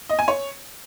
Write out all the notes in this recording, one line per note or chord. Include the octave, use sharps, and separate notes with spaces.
D#5
G#5
C#5